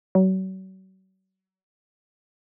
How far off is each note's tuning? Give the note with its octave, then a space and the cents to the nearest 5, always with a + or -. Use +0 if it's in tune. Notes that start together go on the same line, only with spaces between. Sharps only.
F#3 +40